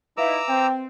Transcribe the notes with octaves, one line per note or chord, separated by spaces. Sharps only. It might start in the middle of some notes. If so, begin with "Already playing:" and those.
D#4 E4 B4 E5 F5 A#5 D6 E6
C4 G5